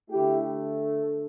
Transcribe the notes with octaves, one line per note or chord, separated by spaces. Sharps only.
D3 A3 E4 G4